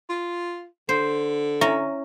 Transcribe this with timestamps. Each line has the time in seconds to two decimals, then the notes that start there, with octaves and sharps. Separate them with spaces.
0.10 F4
0.89 D3 C5
1.61 C#4 E4 E5 A#5